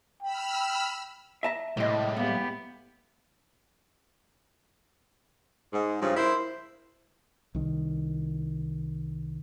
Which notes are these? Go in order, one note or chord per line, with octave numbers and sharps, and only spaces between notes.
G5 B5 E6 F6
E5 A5 A#5
C2 A2 G3 G#3 D#5
A#3 B3 G4
G#2
G2 C#3 F3
E4 A#4 C5
C2 D#3